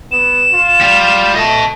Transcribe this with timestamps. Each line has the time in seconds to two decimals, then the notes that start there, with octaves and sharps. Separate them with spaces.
0.12 B3 E7
0.52 F4
0.81 G3
1.35 A3 D#5 A5